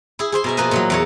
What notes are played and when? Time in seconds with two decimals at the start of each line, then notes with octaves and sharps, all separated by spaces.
0.19 E4 G#4
0.32 G#4 C5 C6
0.44 B2 A#4 E5
0.57 B2 F3 A#3 A#4 B4 D#5
0.71 A#2 E3 F#3
0.90 E2 A#3 C#5